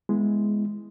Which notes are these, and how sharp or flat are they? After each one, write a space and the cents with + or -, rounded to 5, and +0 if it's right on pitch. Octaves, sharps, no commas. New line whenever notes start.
G#3 +0 B3 +0 E4 +0